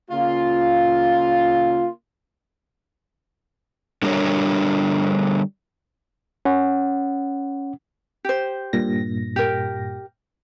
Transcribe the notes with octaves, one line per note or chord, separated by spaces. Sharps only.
C#3 A#3 F4
D3 G3 D4 A#4 C#5
C#4 F#5
G4 C5
G2 A#2 A#6
G4 A#4